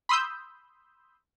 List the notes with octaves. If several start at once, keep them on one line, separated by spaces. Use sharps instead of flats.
B5 C6 D#6 E6 G6